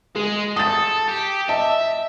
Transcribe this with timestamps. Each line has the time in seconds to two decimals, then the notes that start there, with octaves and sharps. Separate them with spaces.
0.16 G#3 G#4
0.56 A4 D#6 A6
1.08 G4
1.49 D#5 E5 A5